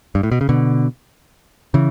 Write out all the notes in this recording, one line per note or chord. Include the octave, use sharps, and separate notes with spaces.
G2
A2
B2
C#3
B2 D3
C#3 E3